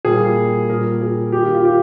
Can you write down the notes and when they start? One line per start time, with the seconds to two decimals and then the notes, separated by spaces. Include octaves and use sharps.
0.05 A#2 G3 A#3 G#4
0.69 A#2 G3 A#3 A#4
1.01 G#4
1.32 D#3 A#3 G4
1.43 F4
1.55 F4
1.65 G4